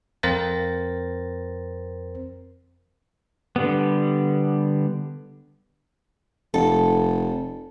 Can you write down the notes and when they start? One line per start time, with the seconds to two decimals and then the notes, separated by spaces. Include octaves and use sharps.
0.23 F2 C4 A#4 C5 A6 A#6
3.56 D3 G3 B3
6.54 F1 A4